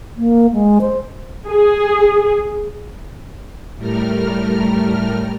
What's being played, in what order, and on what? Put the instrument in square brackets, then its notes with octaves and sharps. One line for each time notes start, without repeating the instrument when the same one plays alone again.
[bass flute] A#3
G#3
C5
[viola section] G#4
[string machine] A2 G3 A3 A#4 F6